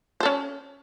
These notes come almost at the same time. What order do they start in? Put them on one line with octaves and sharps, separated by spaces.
C5 A4 C#4